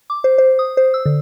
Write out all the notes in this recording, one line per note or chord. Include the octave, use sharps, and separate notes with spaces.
D6
C5
C5
D#6
C5
E6
D3